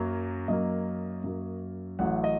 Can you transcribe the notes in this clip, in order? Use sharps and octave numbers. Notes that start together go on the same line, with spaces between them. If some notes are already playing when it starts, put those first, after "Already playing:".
Already playing: F#2 F#3 A#3
F#2 F#3 A#3 D#5
F#2 F#3 A#3
A1 A2 F#3 F#5
D#5